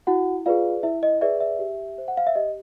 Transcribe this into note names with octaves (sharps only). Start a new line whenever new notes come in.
E4 F#4 F#5
F4 G#4 B4 D5 F5
E4 E5
D#5
G#4 B4 D5 E5
E5
G4
C5
F#5
F5
E5
G4 D#5